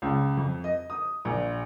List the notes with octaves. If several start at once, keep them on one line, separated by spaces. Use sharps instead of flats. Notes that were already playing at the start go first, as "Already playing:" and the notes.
C#2
F2
D#5
D#6
A#1